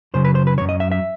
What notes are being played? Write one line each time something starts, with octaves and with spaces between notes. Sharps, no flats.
F#2 C#3 F#3 C5
B4
C5
B4
F#2 C#3 F#3 C#5
D#5
E5
E5